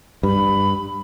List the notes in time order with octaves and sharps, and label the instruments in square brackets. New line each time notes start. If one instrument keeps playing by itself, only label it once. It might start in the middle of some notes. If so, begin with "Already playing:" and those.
[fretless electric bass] G2 [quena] B5